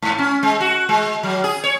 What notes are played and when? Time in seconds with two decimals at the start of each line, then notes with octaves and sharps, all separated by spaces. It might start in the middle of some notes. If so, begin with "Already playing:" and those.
0.02 G#2
0.18 C#4
0.43 G#3
0.61 F#4
0.89 G#3
1.23 F#3
1.44 G#4
1.64 C#5